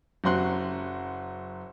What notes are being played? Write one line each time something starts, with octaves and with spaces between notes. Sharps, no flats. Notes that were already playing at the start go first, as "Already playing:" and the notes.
F#1 F#3 F#4 C6 F#6